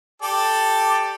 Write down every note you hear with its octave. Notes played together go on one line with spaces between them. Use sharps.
G4 A4 D5